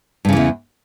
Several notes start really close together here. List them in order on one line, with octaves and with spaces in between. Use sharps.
G2 C#3 E3 E2